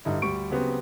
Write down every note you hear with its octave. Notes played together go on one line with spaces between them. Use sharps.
G2 D3 D#4 E4
D2 G3 C#6 D7
C#3 F#3 B3 C4 F#4 G4